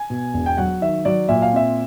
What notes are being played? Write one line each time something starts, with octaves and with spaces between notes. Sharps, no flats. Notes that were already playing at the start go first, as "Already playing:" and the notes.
Already playing: G#5
B2
E1
G5
F#3 F#5
D#3 E5
F#3 D5
A#2 E5
F5
C4 E5